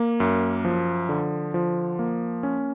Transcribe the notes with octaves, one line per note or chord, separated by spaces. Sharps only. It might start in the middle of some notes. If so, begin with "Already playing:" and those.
Already playing: A#3
F#2
F3
D3
F3
A#3
C#4